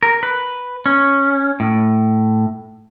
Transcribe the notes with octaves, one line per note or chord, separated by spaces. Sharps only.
A#4
B4
C#4
A2